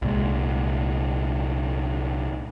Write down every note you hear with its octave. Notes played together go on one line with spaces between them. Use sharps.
C2 A#2 G#3